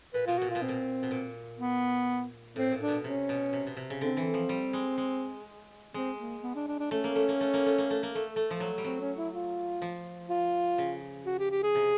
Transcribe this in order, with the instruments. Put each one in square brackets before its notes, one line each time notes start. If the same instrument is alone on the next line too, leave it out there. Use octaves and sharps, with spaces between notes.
[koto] A#2 [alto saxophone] B4
[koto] B2 [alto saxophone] F4
[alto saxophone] F#4
[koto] A#2
[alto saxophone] F4
[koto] B2
[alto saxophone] C4
[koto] A#2
B2
A#2
[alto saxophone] B3
[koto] A2 [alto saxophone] C4
[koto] A#2
[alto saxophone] D4
[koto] B2
[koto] C3 [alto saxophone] C#4
[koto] B2
C3
B2
C3
C#3
[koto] D3 [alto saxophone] C4
[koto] E3
F3
G3
G#3
G#3
[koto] G#3 [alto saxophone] C4
[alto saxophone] A#3
B3
D4
D4
D4
[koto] A3 [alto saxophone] C#4
[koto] A#3
A3
A#3
A3
A#3
A3
A#3
A3
A#3
A3
A3
F3
F#3
G3
[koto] F#3 [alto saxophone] C4
[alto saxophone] C#4
E4
F4
[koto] F3
[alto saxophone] F4
[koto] C#3
[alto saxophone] F#4
G4
G4
G#4
[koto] C3